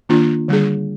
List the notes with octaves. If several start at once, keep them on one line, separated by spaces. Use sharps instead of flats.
D#3 A#3 D4 F4
D3 G3 D4 G#4